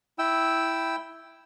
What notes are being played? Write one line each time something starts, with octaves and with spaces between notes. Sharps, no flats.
E4 G5 E6